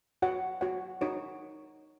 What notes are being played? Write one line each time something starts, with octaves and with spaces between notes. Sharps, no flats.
F#4 C#5 F#5
F#4 C#5 F#5
D#4 F#4 C#5